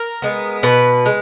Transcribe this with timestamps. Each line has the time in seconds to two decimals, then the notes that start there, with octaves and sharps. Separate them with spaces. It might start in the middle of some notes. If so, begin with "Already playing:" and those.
Already playing: A#4
0.22 G#3 B3
0.63 B2 B4
1.06 G#3